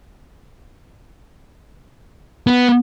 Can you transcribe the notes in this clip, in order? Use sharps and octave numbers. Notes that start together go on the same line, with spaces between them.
B3